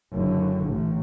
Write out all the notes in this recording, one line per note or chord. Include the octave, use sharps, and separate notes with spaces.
F#1 D3
A1